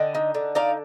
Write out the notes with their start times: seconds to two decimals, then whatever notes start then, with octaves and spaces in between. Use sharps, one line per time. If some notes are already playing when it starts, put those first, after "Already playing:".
Already playing: D3 D#5 G5
0.15 D#4
0.34 D3
0.55 D#4 D5 F5